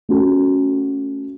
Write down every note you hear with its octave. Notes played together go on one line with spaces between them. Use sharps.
A3 C#4 F#4 A4